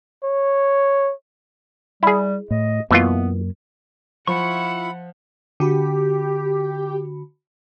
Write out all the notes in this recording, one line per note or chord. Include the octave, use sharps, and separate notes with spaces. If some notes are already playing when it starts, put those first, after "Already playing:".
C#5
G3 E4 G#4
A2 D#5
F#2 B2 E3 A#3 B3 F4
F3 E4 F4 F#5 B5 C#6 C#7
D3 F#4 G4 B5